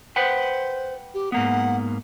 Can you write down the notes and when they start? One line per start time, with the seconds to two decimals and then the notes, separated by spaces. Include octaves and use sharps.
0.16 B4 C5 F#5 G5
1.14 G4
1.32 G#2 A#3 B3 F#5